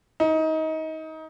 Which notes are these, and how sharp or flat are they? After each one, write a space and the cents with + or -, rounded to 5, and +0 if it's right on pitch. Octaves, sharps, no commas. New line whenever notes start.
D#4 +25